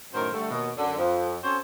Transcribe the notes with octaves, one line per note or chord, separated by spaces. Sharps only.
F#2 A2 D#3 A#4 C5
D3 G3 A3
D#2 B2
F#2 D3
F2
C4 C#4 F#4 A4 C5